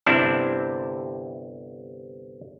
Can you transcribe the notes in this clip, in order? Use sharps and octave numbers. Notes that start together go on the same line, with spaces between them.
G1 C3 C4 D4 E4 A5